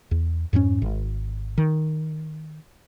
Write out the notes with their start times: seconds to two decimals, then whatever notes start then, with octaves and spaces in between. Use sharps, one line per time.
0.11 E2
0.53 F2 G#2 G3 C#4
0.82 G#1
1.58 D#3